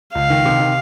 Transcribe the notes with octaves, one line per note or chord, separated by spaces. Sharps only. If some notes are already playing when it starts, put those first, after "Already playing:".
C#2 F5
D#3
C3
D#3